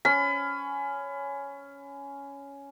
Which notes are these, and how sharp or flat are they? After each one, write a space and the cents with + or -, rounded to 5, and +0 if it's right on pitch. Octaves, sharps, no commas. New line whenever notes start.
C#4 +10 B5 +30